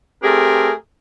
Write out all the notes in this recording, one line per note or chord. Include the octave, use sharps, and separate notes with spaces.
A3 C4 G4 G#4 A#4